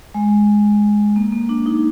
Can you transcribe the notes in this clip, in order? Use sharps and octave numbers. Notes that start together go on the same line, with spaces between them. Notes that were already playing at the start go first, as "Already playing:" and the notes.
G#3
A#3
A#3
D4
D#4